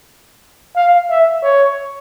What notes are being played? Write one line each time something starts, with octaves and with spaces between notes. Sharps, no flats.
F5
E5
C#5